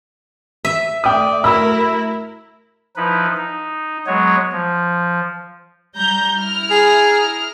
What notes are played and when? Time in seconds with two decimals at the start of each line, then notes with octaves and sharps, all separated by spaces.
0.65 E5
1.04 A3 D5 G5 D#6
1.44 F#2 F#3 A3 E4 A#4 B5 E6
2.96 F3 D#4 E4 B4
3.37 D#4
4.07 F#3 G#3 B3 C#5
4.52 F3
5.96 G3 A#5 G6
6.35 E4 A#5 F6
6.71 G#4